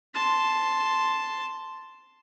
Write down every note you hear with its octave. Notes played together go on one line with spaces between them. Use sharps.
A5 C6